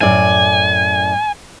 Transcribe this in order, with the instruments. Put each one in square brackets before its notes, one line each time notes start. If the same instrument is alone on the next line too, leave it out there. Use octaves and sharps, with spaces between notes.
[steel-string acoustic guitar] F#2 A2 D5 [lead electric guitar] G#5